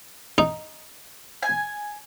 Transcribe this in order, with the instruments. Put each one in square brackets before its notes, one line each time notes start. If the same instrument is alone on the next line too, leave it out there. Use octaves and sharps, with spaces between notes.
[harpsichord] D#4
[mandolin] G#5